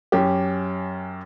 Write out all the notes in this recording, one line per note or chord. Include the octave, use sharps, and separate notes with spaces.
F#2 C#4 G4